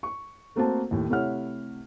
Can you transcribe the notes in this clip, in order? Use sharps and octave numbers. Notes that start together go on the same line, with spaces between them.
C#6
A3 A#3 C4 F#4 C5 A5
D#2 A2
C3 A3 E4 C#5 F#5 F6